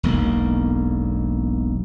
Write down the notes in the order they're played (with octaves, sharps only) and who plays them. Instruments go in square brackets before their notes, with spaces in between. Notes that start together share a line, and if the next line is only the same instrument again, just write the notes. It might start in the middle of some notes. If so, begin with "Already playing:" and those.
[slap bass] E1 B1 A#3